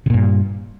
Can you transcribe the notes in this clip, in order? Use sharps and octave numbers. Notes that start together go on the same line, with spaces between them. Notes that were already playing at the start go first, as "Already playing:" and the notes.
G2 A#2 C#3